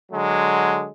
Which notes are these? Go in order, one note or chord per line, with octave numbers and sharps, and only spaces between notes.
D3 F#3 G#3